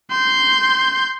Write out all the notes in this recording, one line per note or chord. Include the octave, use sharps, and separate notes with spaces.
C6 G6